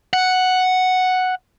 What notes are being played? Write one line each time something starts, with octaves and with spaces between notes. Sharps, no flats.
F#5